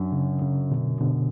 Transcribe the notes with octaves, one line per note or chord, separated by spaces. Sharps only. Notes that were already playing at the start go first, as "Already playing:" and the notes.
Already playing: F#2 D4
C#3
C#3
B2 D3
B2 D3